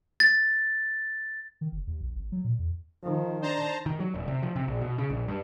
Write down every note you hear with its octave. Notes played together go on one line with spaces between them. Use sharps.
A6
D#3
F#1
D#2
A#1
G#1
F#3
A#2
E2
D#3 F3
D4 C5 A5 A#5
D#3
F#3
D#1
C3
F3
C3
A#1
B2
C#3
A#1
G2